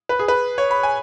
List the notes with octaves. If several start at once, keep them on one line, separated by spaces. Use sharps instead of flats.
B4
G#4
B4
C#5
B5
G#5